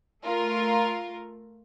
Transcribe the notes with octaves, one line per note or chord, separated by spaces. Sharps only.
A3 F4 A#4